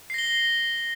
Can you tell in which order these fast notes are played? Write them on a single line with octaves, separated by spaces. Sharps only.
C7 A#6 G7